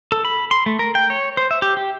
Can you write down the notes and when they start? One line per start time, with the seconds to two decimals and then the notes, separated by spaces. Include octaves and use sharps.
0.12 A4
0.25 B5
0.51 C6
0.66 A3
0.79 A#4
0.95 G5
1.10 C#5
1.37 C5
1.51 E5
1.62 G4
1.77 G4